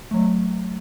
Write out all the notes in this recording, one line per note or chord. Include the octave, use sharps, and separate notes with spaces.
F#3 A3